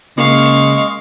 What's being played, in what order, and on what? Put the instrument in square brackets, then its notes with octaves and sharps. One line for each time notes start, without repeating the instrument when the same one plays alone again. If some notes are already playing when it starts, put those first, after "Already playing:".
[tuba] C#3 [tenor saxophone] G#3 [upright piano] A#3 [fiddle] F5 C#6